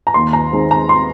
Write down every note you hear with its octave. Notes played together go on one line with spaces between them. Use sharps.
A#5
D#2 C6
A#5
D#3 G#3 C4
A#5
C6